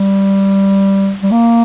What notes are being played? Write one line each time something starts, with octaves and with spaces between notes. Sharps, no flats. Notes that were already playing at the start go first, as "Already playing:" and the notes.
Already playing: G3
G3
A#3